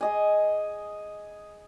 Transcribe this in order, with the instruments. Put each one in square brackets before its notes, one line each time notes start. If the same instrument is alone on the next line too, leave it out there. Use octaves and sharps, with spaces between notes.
[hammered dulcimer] G#4 D#5 G#5